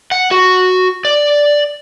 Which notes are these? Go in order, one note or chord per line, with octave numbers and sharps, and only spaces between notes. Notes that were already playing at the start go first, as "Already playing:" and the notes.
F#5
F#4
D5